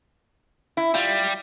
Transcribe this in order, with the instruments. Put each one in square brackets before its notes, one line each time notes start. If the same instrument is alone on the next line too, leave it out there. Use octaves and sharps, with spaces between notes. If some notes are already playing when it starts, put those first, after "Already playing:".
[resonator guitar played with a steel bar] E4
[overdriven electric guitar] G3 [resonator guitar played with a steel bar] F4